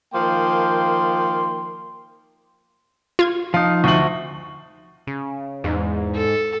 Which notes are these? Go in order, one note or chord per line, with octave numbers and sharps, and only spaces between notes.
D#3 F3 A#3 G5 C6
F4 G#6
F3 D#4 F5
D2 E5 F#5 C#6 F#7
C#3
E2 G#2
A4